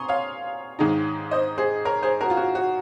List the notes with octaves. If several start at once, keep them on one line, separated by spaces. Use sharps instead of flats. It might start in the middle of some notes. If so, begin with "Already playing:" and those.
Already playing: G#5 A#5 C6 C#6 D#6
C#5 F5
G#2 D#3 G#3 D#4
C5 D#5
G#4 C5
A#4 C#5
G#4 C5
F#4 A#4
F4
F#4
F#4